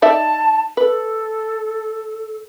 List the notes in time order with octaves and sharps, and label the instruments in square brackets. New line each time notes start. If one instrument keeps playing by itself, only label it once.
[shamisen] D#4 D5 E5 [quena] A5
[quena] A4 [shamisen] B4